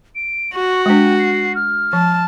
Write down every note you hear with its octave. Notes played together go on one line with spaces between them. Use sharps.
D7
F#4 C#6
G#3 D4 G5
C7
F6
F3 A5